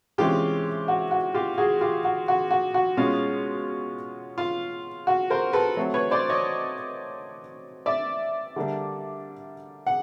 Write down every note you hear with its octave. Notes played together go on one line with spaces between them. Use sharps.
C3 E3 G#3 C#4 E4 F4 G4
F#4
F#4
F4 G4
F#4 G#4
F4 G4
F#4
F#4
F#4
F#4
B2 G#3 C#4 F4
F4
F#4
A#4 C5
A4 B4
F#3 A3 C4
B4 C#5
C5 D5
C#5 D#5
D5 E5
D3 G3 A#3 D4
F#5